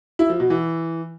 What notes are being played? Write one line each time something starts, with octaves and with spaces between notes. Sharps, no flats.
E4
F3
B2
E3